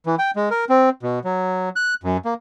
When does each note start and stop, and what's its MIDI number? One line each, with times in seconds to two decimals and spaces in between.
0.06 0.15 52
0.19 0.31 79
0.36 0.49 56
0.51 0.65 70
0.69 0.89 60
1.03 1.19 47
1.24 1.69 54
1.76 1.94 90
2.04 2.17 42
2.25 2.34 58